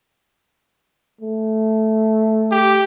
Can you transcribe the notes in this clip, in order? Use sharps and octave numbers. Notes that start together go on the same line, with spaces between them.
A3
G4